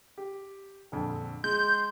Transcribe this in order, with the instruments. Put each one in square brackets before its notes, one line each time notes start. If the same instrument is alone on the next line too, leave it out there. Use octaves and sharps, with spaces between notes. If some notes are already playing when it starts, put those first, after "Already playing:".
[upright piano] G4
A#1 F2 D3
[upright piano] G#3 [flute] C6 [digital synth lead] G6